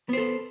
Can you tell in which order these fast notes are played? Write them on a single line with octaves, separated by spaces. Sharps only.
B3 C5 A4